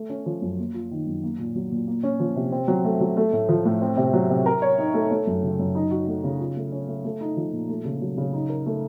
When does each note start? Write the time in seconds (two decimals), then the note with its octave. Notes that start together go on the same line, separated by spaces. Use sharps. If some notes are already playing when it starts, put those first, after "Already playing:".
Already playing: A3
0.10 C#4
0.26 F3
0.42 F#2
0.58 A#3
0.74 F4
0.91 D#3
1.07 F#2
1.23 A#3
1.39 A#2
1.56 F#3
1.71 A#2
1.87 A#3
2.03 C#4
2.20 F3
2.36 C3
2.52 C4
2.68 F#3
2.85 A3
3.01 F#3
3.17 A3
3.33 A2
3.49 F3
3.65 A2
3.81 C4
3.97 C3
4.13 F#3
4.30 C3
4.46 A#4
4.62 C#5
4.78 D#4
4.94 A3
5.11 A3
5.27 F#2
5.43 C#3
5.59 F#2
5.75 D#4
5.91 F#4
6.07 A3
6.24 C#3
6.40 F4
6.56 A3
6.72 C#4
6.88 A3
7.04 A3
7.21 D#4
7.37 F3
7.53 A#2
7.69 A3
7.85 C#3
8.01 F#3
8.18 C#3
8.33 D#4
8.50 A#4
8.66 A3